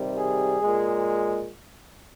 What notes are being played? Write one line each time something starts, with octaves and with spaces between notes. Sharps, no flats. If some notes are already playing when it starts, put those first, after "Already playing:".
Already playing: C3 D#3 G3
G#4
A#2 G#3